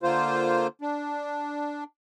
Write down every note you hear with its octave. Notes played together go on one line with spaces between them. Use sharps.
D3 A#3 F4 C5
D4